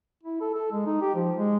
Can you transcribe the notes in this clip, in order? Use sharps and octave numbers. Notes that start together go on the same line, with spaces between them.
E4
A4
A4
G#3
D#4
G4
F3
G#3